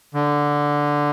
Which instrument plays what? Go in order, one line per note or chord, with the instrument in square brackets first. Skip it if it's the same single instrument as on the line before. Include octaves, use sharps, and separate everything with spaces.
[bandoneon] D3